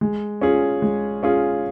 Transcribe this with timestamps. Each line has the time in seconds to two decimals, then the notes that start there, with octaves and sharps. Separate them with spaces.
0.01 G#3
0.41 C#4 F4 G#4
0.82 G#3
1.23 C#4 F4 G#4